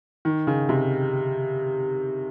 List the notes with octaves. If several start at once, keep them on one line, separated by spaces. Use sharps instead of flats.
D#3
C#3
C3